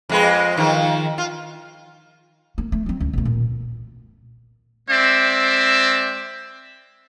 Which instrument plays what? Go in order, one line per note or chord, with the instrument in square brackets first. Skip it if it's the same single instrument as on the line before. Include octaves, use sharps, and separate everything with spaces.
[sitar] F2 G#3 B4
D#3 F3
F4
[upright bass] A#3
A3
F#3 C4
C#2
B1 A3
A#2
[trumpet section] G#3 C4 C5 D5 E5